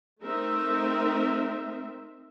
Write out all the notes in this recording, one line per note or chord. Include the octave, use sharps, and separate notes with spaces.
A3 C4 D#4 A#4 E5